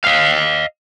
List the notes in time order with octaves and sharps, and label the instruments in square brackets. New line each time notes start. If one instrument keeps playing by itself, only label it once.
[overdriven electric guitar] D#5 F5